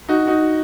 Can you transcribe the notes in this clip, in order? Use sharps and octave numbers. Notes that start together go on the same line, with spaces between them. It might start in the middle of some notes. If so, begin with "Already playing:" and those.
D#4 F#4
D#4 F#4